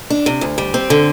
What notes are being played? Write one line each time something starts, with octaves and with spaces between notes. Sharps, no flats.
D4
C3
D2
G3
C4
D3